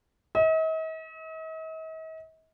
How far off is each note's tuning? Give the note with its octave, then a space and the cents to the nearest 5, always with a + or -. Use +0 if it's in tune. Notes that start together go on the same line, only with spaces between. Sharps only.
D#5 +45